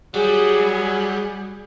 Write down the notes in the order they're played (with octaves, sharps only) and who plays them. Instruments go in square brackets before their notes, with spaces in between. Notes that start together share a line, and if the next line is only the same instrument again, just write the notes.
[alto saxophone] F#3 [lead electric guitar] G3 [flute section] G#4